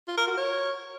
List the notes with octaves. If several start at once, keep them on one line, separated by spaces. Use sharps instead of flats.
F4
A#4
F#4
C#5